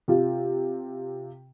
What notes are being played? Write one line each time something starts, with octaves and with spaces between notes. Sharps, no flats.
C3 F4